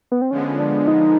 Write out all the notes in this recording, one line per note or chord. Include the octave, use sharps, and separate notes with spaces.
B3
C4
D3 F3 G#3 B3 C#4
D4
D#4